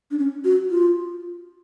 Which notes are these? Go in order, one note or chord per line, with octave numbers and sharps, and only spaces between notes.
D4
C#4
F#4
F4